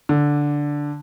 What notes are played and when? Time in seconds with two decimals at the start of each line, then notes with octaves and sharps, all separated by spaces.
0.09 D3